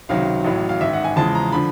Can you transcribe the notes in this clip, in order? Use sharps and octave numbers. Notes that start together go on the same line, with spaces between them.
C#2 C3 D#3 F#3 F5
A1 A2 F#3
F5
A1 G#2 D#3 E5
F#5
G#5
E2 C#3 F3 G#3 A5
A#5
D3 F3 B5